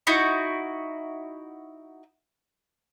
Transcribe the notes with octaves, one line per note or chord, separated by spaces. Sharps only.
D#4 E4 F#4